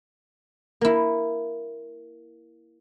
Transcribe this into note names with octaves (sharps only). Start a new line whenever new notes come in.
A#3 E4